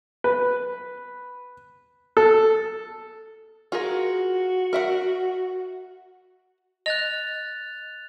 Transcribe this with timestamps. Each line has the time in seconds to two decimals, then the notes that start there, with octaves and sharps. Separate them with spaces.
0.24 B4
2.17 A4
3.72 F4 F#4 G#4 A#4
4.73 A#4 E5 F#5
6.86 D#5 F#6 A6 F7